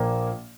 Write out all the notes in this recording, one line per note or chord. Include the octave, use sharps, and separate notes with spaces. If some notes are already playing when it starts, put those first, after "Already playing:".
Already playing: A#1 A#2 F3 A#3